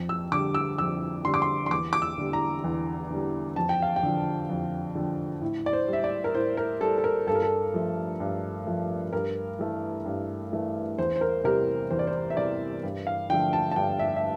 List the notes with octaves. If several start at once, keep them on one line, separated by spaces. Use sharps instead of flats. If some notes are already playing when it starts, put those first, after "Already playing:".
Already playing: F2
E6
D3 G3 D6
E6
F2 E6
D3 G3 C6
D6
C6
C6
E2 D6
D6
E6
D3 G3
A#5
E2
D3 G3
F2 A5
G5
F5
G5
D3 F3
F2
D3 F3
A2
D5
C5
G3
E5
D5
A#4
A2 C5
A#4
G3 A4
A4
A#4
G2 A4
A#4
A4
F3 A3
G2
F3 A3
G2 A#4
E3 A3
G2
E3 A3
E2 C5
C5
A#4
C3 G3 A#4
E2 C5
D5
C5
E5
C3 G3 D5
G2
F5
D3 F3 A3 G5
A5
A5
G2 G5
E5
E5